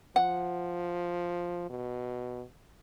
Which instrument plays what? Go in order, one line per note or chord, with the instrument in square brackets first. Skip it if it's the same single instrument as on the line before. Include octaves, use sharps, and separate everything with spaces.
[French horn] F3 [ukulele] F#5
[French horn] B2